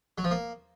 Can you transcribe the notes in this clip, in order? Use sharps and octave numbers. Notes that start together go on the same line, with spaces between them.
F#3
F3
A#3